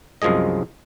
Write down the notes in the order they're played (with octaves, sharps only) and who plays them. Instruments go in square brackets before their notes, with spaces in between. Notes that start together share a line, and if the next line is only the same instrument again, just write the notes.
[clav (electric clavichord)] C2 F#2 F3 G#3 G#4 D#5